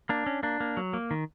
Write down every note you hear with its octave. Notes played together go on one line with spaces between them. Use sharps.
A#3 D4
C#4
A#3 D4
A#3
F#3
A#3
D#3